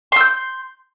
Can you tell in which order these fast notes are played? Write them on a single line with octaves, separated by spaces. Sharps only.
C6 E6 G6